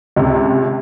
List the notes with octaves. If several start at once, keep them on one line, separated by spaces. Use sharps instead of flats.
C#2 C3